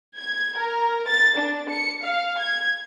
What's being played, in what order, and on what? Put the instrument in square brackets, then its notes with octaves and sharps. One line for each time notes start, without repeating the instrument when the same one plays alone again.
[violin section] G#6
A#4
A6
D4
C#7
F5
G#6